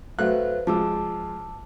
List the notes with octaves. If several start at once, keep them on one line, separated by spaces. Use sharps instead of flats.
F#3 A3 B4 C5 F5 F#6
F3 G#3 A5 D6 E6